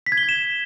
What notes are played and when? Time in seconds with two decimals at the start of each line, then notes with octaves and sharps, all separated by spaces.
0.06 B6
0.12 G#6
0.18 G7
0.23 G#6
0.29 E7